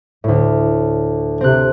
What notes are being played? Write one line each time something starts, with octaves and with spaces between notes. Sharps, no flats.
D2 A2
C3 C4 F#6